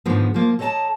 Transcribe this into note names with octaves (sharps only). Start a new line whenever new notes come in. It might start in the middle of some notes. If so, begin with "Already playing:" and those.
G#2 D3 D#3 F3 G#3 B3
F3 A#3 F4
A4 C#5 D#5 F5 A5 A#5